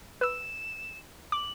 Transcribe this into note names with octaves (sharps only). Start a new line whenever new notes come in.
B4 E6 E7
D6 F#7